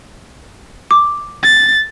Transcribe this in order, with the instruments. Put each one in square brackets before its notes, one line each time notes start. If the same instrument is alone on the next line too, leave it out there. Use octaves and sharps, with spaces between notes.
[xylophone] D6
[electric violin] A6